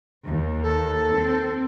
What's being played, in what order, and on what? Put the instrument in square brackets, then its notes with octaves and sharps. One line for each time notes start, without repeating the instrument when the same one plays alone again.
[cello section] D#2
[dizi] A4
[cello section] C4